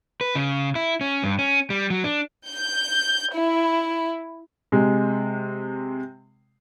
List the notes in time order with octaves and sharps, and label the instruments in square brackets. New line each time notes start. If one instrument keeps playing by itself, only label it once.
[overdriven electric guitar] B4
C#3
E4
C#4
G2
C#4
G3
F#3
D4
[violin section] G6
E4
[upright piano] C3 G#3